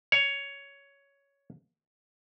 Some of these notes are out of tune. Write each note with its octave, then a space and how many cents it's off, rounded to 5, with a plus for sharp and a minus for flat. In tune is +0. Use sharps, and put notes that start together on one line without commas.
C#5 +10